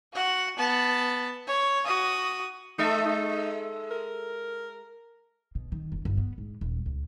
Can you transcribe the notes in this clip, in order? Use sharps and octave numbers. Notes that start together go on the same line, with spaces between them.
F#4 F#5
B3 A5
C#5
F#4 D#6
G#3 D#4 A4 E5
D#4
A#4
B2
D#3
F1
G1
B3
G#2
D#1
C#2